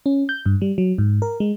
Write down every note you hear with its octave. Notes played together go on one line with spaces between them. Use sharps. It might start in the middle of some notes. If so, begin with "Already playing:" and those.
C#4
G6
G2
G3
F#3
G#2
A#4
G#3